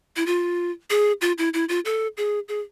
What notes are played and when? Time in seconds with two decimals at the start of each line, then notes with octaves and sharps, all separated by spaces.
0.16 E4
0.26 F4
0.90 G#4
1.21 F4
1.38 E4
1.54 E4
1.69 F4
1.85 A4
2.17 G#4
2.48 G#4